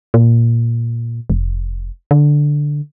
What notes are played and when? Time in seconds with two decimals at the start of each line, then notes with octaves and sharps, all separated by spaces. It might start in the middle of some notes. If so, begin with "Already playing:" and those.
0.14 A#2
1.30 F1
2.11 D3